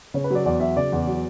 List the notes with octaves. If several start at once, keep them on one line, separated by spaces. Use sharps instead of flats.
C#3 C#5
B4
F#3 D5
E2 D5
F#3 E5
C#3 D5
E2
F#3